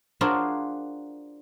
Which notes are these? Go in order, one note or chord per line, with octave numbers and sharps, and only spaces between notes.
D4 F4 F#4 G#4 A#4 C5